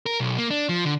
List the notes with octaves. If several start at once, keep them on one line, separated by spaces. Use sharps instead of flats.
A#4
B1
A#3
D4
F3
D3